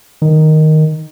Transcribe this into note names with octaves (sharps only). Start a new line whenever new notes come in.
D#3